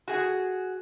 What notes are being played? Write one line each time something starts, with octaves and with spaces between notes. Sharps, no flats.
F#4 G#4